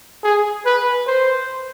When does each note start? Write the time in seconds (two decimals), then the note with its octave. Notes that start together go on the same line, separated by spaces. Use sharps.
0.23 G#4
0.66 B4
1.07 C5